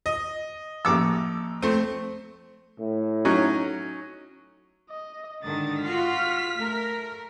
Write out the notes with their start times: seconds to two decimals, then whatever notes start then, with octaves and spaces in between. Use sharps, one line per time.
0.06 D#5
0.85 A1 F3 A#3 D6 E6
1.62 A3 C4
2.79 A2
3.25 F#3 C#4 D#4
4.90 D#5
5.43 G#2 D3 D#3 D#6 A6
5.82 F4 F#4 F6 B6
6.55 A3 A#4